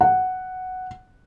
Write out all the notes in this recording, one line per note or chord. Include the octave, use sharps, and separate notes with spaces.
F#5